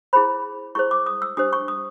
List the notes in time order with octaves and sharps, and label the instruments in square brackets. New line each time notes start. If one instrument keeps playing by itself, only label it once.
[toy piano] E4 G#4 C5 B5
E4 G#4 C5 C#6
D6
D#6
E6
D4 G4 C5 D#6
C#6
D#6